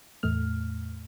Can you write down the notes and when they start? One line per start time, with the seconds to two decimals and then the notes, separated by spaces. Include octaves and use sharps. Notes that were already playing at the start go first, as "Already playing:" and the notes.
0.23 E2 A2 A3 F6